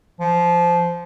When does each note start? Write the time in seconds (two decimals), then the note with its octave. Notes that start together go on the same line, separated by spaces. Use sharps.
0.20 F3